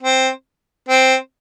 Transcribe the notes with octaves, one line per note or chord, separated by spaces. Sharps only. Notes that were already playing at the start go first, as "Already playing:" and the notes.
C4
C4